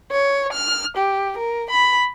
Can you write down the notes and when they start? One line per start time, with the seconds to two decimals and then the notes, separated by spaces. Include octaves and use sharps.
0.11 C#5
0.52 F6
0.97 G4
1.37 A#4
1.70 B5